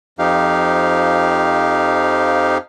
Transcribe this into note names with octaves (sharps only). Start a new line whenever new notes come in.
F2 F3 D#4 G4 F5